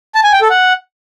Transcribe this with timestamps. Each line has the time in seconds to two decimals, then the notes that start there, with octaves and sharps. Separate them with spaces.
0.15 A5
0.24 G#5
0.32 G5
0.41 A4
0.50 F#5